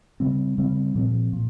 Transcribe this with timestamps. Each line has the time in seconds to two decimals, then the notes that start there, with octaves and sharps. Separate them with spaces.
0.20 C#3 G3 C4
0.58 C#3 G3 C4
0.95 A#2 F3 C4
1.33 A#2